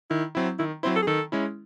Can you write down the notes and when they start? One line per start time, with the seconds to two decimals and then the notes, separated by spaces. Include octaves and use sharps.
0.10 D#3 E4
0.35 F#3 C4 E4
0.59 D#3 E4
0.83 F#3 C4 E4 C5
0.96 A4
1.02 G#4
1.07 D#3 A4
1.32 G#3 C#4 E4